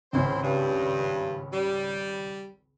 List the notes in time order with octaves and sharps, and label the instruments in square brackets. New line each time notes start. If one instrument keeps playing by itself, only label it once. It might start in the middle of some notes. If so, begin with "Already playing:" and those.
[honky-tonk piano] G#1 C#2 C#4 [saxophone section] C4 E4 C5
[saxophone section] G2
G3